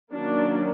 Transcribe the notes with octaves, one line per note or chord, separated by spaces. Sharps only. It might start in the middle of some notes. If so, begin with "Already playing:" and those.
D#3 F#3 A#3 C#4 D4